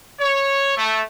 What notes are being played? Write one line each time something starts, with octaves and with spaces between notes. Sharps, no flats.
C#5
A3